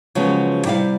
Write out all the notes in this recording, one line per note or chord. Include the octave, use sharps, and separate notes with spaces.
C#3 F3 F#3 G#3 B3
C3 G3 E4 D#5 F5